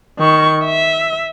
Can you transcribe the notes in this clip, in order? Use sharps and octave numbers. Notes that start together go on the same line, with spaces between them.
D#3 C#6
E5